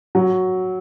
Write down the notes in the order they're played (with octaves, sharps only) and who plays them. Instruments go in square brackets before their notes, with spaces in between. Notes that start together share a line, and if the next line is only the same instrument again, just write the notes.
[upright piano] F#3